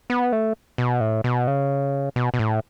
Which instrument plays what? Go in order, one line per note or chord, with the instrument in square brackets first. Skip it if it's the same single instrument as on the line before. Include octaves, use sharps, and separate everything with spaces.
[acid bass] B3
A3
B2
A2
B2
C#3
B2
B2
A2